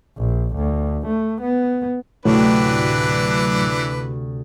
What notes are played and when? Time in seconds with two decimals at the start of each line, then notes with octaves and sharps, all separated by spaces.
0.18 A#1
0.55 D2
1.07 A3
1.41 B3
2.25 D2 A2 C3 E3 F#3 D4 F#4 B4